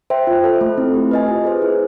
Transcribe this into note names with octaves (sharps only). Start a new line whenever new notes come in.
C5 E5 G5
F4
A4 C5
A3
C4 E4
G4
B4 D#5 G#5
F4
G#4 C5
E4